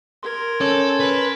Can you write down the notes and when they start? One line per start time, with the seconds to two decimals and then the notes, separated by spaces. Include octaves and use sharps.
0.23 A#4 C6 G#6
0.61 C#4 A4 C#5 A5
1.00 A#4 B4